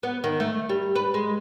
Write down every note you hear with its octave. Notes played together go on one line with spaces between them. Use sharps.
B3
D#3
A3
G3
B4
G#3